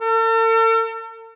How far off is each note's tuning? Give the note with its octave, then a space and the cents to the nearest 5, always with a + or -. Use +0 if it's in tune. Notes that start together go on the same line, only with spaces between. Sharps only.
A4 +45